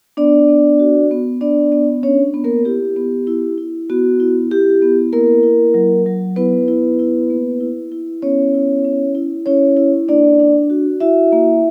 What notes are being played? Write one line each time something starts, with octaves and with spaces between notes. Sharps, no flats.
B3 D4 D5
B3
F#4
B3
B3 D4 D5
B3
C#4 D4 C#5
B3
A#3 A#4
E4 G4
B3
E4
E4
B3 F#4
E4
E4 G4
B3
A#3 E4 A#4
E4
F#3
F#3
B3 E4 B4
E4
E4
A#3
E4
E4
B3 C#4 C#5
E4
C#4
E4
C#4 E4 C#5
E4
A#3 D4 D5
D4
F#4
E4 F#4 E5
A#3